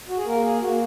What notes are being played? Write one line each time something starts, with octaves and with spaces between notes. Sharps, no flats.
F#4
G#4
A#3 A#4
G#4
A#3 F#4